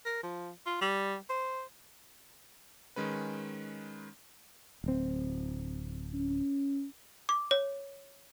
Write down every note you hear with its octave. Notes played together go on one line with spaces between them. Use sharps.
A#4
F3
F4
G3
C5
D#3 G#3 C#4 B4
D1 C4
C#4
D6
C#5